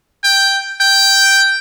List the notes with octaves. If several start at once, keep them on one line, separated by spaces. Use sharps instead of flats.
G5
G5